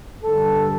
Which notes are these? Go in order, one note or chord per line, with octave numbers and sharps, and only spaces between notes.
G2 D3 G3 A4